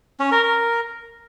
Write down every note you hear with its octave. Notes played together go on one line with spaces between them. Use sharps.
C#4
A#4
A#4